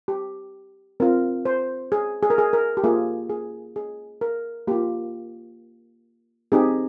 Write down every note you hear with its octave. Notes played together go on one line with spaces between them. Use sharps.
G4
C4 F4 A#4
C5
G#4
G#4
A#4
G#4
A#4
G4
A#3 F4 G#4
G#4
G#4
A#4
A#3 F4 G4
C4 D#4 G4 G#4